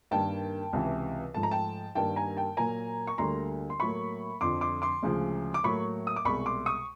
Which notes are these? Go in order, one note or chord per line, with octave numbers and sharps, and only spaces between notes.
G2 D#3 G3 A#3 G5 A5
C#2 C3 E3
G#2 F3 A3 A5
A#5
G5 A5
G2 D#3 G3 A#3 G5 A5
G#5 A#5
G5 A5
A#2 F#3 A#3 G#5 A#5
C#6
D2 D3 G3 A#3 A#5 C6
C6
A2 F#3 A#3 B5 C#6
F2 D3 F3 C6 D6
C6 D6
C6 D6
D2 C#3 F3 G#3
D6
A2 F#3 A#3 B5 C#6
D#6
D6
C2 B2 G#3 B5 C#6
C6 D6
C#6 D#6